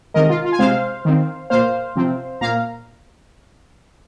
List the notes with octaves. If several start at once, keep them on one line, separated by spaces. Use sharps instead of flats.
C3 D#3 G#3 A#4 D#5
F4
F4
G#5
C3 G#3 C4 C5 F5
D#3 C4
A#2 A#3 C5 F5
C3 F3 C4
A#2 A#3 F5 A#5